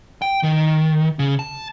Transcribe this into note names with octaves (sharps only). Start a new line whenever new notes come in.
G5
D#3
C#3
A5